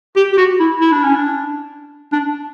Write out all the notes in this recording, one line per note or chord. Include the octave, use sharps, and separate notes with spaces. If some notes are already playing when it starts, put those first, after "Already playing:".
G4
G4
F#4
E4
E4
D4
C#4
D4
D4